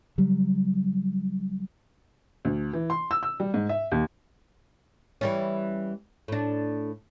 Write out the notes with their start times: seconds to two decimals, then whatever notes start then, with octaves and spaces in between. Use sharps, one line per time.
0.18 C#3 F#3 G3
2.45 D2
2.73 E3
2.90 C6
3.11 E6
3.23 E6
3.40 G3
3.54 G#2
3.69 E5
3.92 D#2
5.21 E3 G3 C#4
6.28 A2 D4